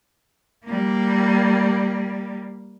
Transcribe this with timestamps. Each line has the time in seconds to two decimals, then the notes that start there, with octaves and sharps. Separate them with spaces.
0.65 G3 A#3